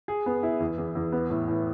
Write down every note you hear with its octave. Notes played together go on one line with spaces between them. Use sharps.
G#4
B3
E4
E2
E2
E2
B3
A2
A2